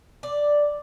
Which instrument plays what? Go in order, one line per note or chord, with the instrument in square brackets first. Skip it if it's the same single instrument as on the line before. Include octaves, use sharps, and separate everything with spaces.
[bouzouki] D5